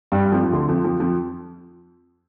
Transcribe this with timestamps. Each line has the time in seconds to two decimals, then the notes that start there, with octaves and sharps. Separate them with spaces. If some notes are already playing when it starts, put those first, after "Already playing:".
0.12 G2 G3
0.25 G3
0.32 F2 F3
0.43 F3
0.53 D2 D3
0.68 F2 F3
0.84 F2 F3
1.00 F2 F3